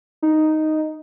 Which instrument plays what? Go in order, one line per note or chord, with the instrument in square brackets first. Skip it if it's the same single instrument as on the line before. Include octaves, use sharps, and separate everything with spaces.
[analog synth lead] D#4